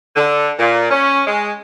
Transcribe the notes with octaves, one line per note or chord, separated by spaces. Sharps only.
D3
A#2
C#4
G#3